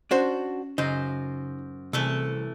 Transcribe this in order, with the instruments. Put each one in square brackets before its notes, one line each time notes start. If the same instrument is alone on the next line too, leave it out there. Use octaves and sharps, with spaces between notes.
[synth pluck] C#4 [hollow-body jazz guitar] D4 F#4 C5
[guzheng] F#2 C5 [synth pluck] C#3 [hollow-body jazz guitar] D#4
[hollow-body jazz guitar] C2 [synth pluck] C3 [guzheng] E3 A3 A4